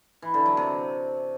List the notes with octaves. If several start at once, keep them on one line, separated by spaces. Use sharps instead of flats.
E3
D3
F#3
C3